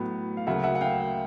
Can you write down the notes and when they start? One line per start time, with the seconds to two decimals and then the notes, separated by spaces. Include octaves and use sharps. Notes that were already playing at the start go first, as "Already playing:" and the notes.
Already playing: A2 F#3 B3
0.37 F5
0.47 D2 C#3 F#3 A#3 E5 F#5
0.64 E5 F#5
0.75 F#5
0.81 F5 G5